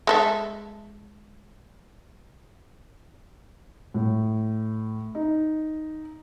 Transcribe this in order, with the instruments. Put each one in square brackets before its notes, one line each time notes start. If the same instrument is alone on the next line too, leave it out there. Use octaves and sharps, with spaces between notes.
[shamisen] G#3 A4 E5
[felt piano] A2
D#4